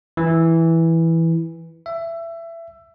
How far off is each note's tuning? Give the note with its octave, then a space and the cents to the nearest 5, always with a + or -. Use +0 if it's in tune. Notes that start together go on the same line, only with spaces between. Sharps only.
E3 -5
E5 +20